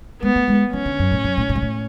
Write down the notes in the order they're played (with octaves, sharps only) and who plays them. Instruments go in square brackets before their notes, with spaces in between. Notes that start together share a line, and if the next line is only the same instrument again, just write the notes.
[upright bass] G#3 [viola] B3
[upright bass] A3
G#3
[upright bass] E3 [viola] C#4
[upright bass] D3
F#2
A2
F#2
A2
A2
G#2
A2